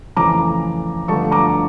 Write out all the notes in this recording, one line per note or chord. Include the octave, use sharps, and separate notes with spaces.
F2 C#3 E3 A3 A#5 D6
G1 G2 D3 F3 A3 A5 C#6
A#5 D6